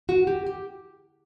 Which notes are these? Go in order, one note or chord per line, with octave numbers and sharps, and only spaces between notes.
F#4
G4
G4